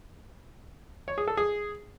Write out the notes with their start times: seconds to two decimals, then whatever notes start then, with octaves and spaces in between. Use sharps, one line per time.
1.08 C#5
1.18 G#4
1.28 A4
1.37 G#4